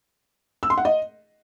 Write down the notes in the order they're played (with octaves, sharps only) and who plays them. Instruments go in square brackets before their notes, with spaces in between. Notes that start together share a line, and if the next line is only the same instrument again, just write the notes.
[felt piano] E6
C6
F#5
D#5